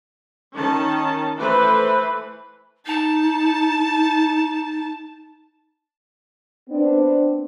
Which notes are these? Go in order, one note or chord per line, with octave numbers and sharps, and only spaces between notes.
D#3 C#4 A5
E3 A3 B4 C5
D#4 A5
B3 C4 D4